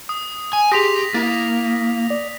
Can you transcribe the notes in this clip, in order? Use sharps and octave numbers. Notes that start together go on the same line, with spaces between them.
D#6
G#5
G4 G#4 C6 D#6 A#6 B6 F7
A#3 E4 A6
D5